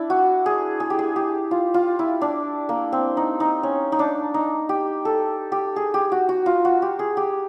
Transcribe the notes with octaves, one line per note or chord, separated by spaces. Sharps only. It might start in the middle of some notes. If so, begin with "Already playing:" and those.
Already playing: D4 E4
F#4
G#4
G#4
G4
G#4
G4
F4
F4
E4
D4
A#3
C4
D#4
D#4
C#4
D#4
D4
D#4
G4
A4
G4
G#4
G4
F#4
F#4
F4
F#4
G4
G#4
G4